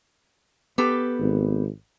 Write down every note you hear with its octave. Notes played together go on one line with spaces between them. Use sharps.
B3 G4 A4 B4
G#1